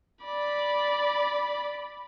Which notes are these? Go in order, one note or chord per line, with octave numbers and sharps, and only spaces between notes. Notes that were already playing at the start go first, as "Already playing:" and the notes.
D5 B5